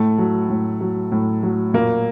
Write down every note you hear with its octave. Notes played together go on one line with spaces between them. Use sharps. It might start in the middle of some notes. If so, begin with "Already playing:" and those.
Already playing: A2 A3
F#3
A2
F#3
A2
F#3
A#2 A#3